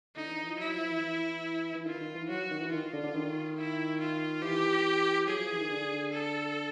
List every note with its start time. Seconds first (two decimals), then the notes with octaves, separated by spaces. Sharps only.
0.16 D3 D#4
0.26 E3
0.37 E3
0.48 F3
0.59 F#3 E4
0.73 F3
0.88 E3
1.01 E3
1.75 E3
1.86 D#3 F4
2.01 D#3
2.15 E3
2.29 F#3 F#4
2.51 D#3
2.61 E3
2.71 D#3 F4
2.93 D3
3.03 D3
3.14 D#3
3.57 E4
4.00 F4
4.42 E3 G4
5.27 F#3 G#4
5.38 F3
5.49 E3
5.60 D#3
5.70 D3
6.13 A4